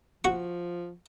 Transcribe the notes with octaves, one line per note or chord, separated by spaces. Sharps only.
F3 F#4 C#6